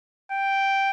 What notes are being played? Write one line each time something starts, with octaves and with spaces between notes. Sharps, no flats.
G5